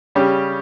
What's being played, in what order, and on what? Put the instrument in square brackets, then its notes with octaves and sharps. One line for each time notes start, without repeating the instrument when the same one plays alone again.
[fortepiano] C#3 G3 C#4 G4